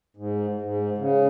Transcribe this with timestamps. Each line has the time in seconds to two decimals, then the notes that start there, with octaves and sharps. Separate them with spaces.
0.17 G#2
0.61 G#2
0.98 C#3